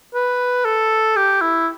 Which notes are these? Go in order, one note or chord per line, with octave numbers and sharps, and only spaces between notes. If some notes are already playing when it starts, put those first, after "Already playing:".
B4
A4
G4
E4